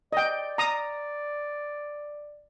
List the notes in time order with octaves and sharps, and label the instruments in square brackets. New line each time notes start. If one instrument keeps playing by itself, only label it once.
[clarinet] D5 [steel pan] D#5 G5
[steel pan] A#5 D#6